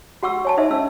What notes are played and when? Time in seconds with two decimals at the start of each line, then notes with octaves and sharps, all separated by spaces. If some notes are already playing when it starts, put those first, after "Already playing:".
0.23 F#4 F#5 C#6 E6
0.45 C#5 G#5 A5
0.57 D#4 C5 D#5 E5
0.71 C#4 E6